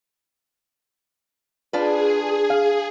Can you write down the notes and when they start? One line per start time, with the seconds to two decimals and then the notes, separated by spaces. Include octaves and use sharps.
1.73 D4 F4 G#4 B4
2.50 F5